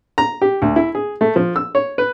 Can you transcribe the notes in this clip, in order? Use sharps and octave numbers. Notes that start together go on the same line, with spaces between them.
A#5
G4
D2
E4
G#4
A3
F3
E6
C#5
B4